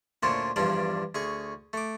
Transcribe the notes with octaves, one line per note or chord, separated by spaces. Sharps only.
D2 A#2 C#4 D4 C5 A5
E2 G2 F3 G3 D4 D5
D2 G#4 C#6
A3 D6